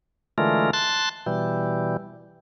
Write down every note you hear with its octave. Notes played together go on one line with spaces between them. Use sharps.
D3 E3 G#3 A3 F4 A#4
A5 C6 F#6 A6
B2 E3 G3